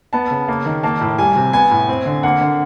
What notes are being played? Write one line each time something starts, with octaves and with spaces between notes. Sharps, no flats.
B3 A5
C#3
A#3
D#3
A#3 A5
A2
G3 G#5
C3
B3 G#5
A2
C4
D3
A#3 F#5
D3